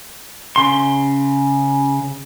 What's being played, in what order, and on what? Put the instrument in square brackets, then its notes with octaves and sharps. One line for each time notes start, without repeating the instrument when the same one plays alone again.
[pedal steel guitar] C#3 C6